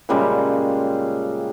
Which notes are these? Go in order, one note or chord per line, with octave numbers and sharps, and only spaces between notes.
A#2 C#3 G3 G#3